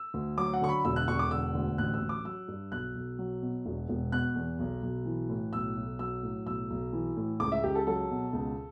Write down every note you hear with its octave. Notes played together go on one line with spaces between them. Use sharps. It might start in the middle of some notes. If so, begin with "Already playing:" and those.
Already playing: E6
D2
F#3 D6
F#5
D3 C#6
B5
E1 E6
F#6
E1 C#6
D6
D3 E6
D2
A1 F#6
E6
A1
D6
F#3 E6
G2
B1 F#6
B1
F#3
B2
E1
E1
B2 F#6
E2
B1
B1
E3
A2
B1 E6
B1
F#3 E6
A2
B1 E6
B1
E3
A2
C#2 D6
E5
C#2 G4
A4
F#3 A4
B2
C#2